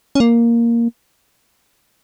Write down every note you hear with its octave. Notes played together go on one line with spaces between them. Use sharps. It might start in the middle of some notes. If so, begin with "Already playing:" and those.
C#4
A#3